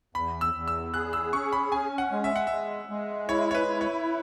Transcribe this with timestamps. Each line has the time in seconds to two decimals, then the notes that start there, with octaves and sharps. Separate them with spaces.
0.15 E2 B5
0.41 E6
0.54 E2
0.68 E6
0.94 G#4 F#6
1.13 E6
1.33 C#4 C#6
1.53 B5
1.72 C#4 G#5
1.98 F#5
2.12 G#3
2.24 E5
2.36 F#5
2.47 G#3 E5
2.89 G#3
3.29 E4 C#5
3.51 C#5
3.55 B4
3.68 E4
3.81 C#5